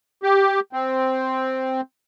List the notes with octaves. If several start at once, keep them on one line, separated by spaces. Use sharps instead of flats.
G4
C4